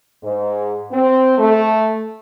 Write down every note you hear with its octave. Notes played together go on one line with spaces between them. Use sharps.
G#2
C4
A3